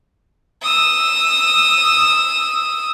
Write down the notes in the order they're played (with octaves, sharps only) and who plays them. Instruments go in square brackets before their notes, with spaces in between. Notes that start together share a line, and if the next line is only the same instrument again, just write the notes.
[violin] D#6 E6